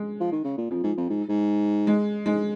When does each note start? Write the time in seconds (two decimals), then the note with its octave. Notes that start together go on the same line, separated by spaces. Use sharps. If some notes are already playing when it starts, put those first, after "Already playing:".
Already playing: G#3
0.20 F3
0.32 D#3
0.44 C#3
0.58 A#2
0.70 F2 F3
0.83 G#2
0.97 F2
1.09 G#2
1.29 G#2
1.87 G#3
2.26 G#2 G#3